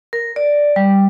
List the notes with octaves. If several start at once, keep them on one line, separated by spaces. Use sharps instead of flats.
A#4
D5
G3